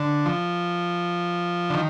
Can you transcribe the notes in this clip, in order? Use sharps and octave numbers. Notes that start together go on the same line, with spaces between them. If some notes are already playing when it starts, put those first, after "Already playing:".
Already playing: D3
F3
D3
D#3